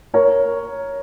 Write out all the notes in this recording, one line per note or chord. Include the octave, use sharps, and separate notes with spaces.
A#4 C#5